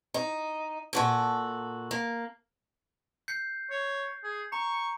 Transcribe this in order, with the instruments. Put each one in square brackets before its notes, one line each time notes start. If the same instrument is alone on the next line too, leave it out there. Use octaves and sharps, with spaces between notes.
[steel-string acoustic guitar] D#4
A#2 F#4 A4
A#3
[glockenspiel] G6 C7 C#7
[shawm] C#5
G#4
[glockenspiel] A#5 [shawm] C#6